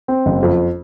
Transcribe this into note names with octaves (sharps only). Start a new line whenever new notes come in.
C4
F#1
F2